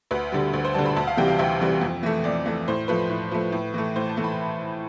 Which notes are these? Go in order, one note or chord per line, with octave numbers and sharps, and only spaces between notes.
D2 B4
D3 G3
D2
C5
D3 G3 A5
B5
D2 A5
F5
C3 E3 G3 G5
F5
D2 E5
C3 E3 G3
F2
E3 A3
F2 D5
E3 A3
A2 C5
F3 A3 B4
A2
F3 A3
A2
E3 A3
A2 C5
A5
E3 A3
B5